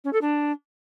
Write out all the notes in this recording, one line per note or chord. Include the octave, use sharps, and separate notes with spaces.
C#4
A4
D4